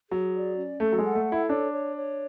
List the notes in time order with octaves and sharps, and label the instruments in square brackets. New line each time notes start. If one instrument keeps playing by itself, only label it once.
[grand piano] F#3 [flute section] G#4
[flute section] D5
C#4
[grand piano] A3 [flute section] A4
[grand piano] F#3
G#3
[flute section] F#5
[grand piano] A3
[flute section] A4
[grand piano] E4
[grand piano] D4 [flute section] C#5
[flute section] C#5
C#5